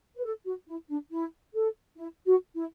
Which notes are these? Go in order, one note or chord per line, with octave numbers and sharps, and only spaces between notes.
B4
A4
F#4
E4
D4
E4
A4
E4
F#4
E4